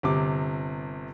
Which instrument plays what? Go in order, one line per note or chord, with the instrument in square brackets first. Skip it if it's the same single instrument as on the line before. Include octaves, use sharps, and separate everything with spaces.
[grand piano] G1 C3 D6